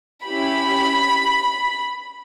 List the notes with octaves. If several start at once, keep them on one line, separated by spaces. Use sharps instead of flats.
C#4 E4 G4 B5